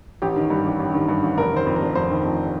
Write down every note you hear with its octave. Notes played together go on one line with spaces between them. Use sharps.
A1 G4
D#3
G2
A1
A1
D#3
G2
A1
F1 A#4
D#3 C5
F2
A#4
F1
F1 C5
D#3
F2